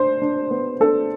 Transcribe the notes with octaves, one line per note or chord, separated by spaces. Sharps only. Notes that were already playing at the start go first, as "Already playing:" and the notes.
Already playing: D4 C5
D4
B3
D4 A4